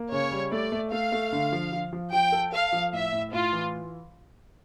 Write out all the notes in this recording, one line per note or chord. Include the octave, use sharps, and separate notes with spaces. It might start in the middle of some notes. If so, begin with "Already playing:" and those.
Already playing: A#3
C#3 C#5
G3
A3 D5
A3
A3 F5
A3
D3
F3
F3
F3
F3 G5
A4
A4 F5
F3
A2 E5
A2
A2 F4
E3